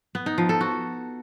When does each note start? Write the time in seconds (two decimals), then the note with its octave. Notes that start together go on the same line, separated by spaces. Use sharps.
0.15 B3
0.26 D#4
0.38 F3
0.49 A4
0.61 F#4